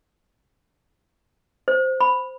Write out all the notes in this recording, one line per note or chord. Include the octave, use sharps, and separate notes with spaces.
C5
B5